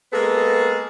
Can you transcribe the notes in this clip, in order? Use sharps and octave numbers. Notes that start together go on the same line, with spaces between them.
G#3 A#3 B3 G#4 A4